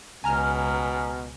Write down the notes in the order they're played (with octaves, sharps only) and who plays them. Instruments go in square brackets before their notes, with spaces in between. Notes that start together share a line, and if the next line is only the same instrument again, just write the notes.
[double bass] C#2 [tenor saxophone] B2 [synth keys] G#5 A#5 F6